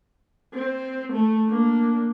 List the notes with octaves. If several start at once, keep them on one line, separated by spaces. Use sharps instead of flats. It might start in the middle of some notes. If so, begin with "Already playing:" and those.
C4
A3
A#3 D4